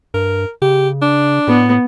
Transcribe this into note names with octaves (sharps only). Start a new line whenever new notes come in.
G2 A#4
C#3 G4
D4
A2 B3